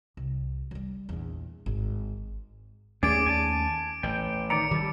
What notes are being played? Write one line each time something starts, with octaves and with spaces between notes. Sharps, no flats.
C2
F#3 G3
A#1 E2
G#1
D#2 A3 C#4 G#4 D5 D6 D7
G#5 A5
A1 G5
D#3 D5 A#5 C#7
D#3 G3 A4